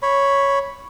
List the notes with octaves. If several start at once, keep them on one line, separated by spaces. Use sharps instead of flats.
C#5 B5